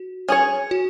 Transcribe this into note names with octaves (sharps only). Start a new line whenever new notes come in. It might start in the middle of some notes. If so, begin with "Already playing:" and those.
Already playing: F#4
C#4 G#4 C#5
F#4